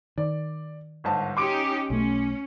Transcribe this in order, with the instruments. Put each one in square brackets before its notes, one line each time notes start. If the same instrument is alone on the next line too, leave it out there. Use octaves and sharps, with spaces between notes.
[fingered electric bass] D#3 [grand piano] D5
[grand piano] G1 G#2 A5
[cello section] C#4 D#4 G4 [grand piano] C6 D6 D7
[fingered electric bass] B1 B2 A3 [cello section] C#4